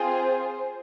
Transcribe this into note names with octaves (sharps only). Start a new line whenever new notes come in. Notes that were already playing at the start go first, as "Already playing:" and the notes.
Already playing: C4 F4 G#4 C5